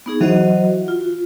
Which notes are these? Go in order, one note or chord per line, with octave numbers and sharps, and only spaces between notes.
B3 D#4 G#4
E3 F#3 F#4 C5 D#5
F4